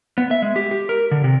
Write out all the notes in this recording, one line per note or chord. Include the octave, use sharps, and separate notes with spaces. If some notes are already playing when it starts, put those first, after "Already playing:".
B3
E5
G#3
G4
G4
A#4
D3
C3